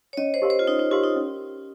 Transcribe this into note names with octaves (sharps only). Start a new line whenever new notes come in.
C#5
C#4 D#5
C5
G4 A#4 F5 C6
C5
F4
C#4 D#4
D#4
F4 G4 A#4 F5 C6
D#4
C#4